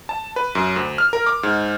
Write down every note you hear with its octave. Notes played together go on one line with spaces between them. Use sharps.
A5
B4
F#2
D2
F6
A#4
D6
G#2